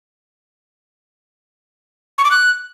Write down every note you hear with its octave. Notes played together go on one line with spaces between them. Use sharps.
C#6
D6
F#6